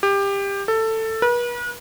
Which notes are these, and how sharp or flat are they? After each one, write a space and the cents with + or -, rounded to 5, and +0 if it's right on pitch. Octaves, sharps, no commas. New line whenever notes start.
G4 +20
A4 +15
B4 -40